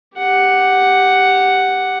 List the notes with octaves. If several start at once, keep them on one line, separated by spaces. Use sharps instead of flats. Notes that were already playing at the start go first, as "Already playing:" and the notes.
G4 F#5